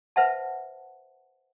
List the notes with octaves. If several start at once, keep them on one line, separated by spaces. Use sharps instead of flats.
B4 C5 E5 F#5 A5